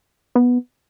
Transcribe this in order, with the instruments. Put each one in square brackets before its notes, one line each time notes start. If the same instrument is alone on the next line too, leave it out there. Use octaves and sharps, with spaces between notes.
[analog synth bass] B3